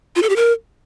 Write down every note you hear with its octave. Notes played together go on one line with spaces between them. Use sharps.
F4
A4
G4
A#4